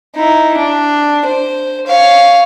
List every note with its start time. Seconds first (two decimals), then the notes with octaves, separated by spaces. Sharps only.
0.15 D#4 E4
0.58 D4
1.25 C5
1.87 C#5 F5